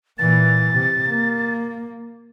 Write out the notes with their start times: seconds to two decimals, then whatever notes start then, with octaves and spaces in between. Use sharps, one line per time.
0.19 A#2 E3 A6
0.72 C3
1.07 A#3